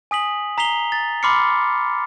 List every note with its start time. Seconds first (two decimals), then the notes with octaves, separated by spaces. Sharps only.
0.11 G#5 D#6 B6 F#7
0.58 A#5 B6 C7 F7 G7
0.92 A6
1.23 B5 C6 D6 F6 C7 C#7